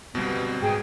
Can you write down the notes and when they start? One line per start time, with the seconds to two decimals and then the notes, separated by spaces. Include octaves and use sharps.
0.15 G1 C#2 B2 G3 B3 C4
0.62 G#2 G#4 G5